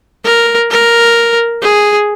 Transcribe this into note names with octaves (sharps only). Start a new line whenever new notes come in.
A#4
A#4
G#4